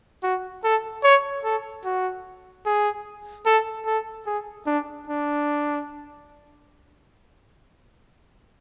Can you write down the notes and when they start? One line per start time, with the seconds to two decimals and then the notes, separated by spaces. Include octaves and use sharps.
0.23 F#4
0.64 A4
1.04 C#5
1.44 A4
1.85 F#4
2.66 G#4
3.46 A4
3.86 A4
4.26 G#4
4.66 D4
5.08 D4